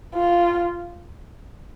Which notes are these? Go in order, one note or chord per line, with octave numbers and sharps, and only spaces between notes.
F4